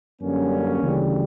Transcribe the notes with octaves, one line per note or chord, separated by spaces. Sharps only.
F#2 D3 G3 A#3 C#4
D2 C#3 E3 G3